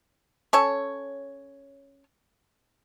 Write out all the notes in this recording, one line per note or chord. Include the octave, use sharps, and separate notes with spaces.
C#4 A4 C#5